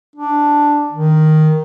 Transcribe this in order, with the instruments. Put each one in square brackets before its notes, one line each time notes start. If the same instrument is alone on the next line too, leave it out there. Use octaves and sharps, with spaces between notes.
[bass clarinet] D4
D#3